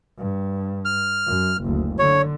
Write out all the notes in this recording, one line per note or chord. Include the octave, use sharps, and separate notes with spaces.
G2
F6
F#2
F#1 D2
D3 C#5